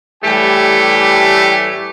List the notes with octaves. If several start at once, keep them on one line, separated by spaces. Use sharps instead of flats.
A2 E3 G3 A3 G4 G#5